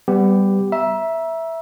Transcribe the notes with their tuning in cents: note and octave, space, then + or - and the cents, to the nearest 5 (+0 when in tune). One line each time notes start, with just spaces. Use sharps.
G3 -10 B3 +15 G4 +0
E5 +0 A#5 +30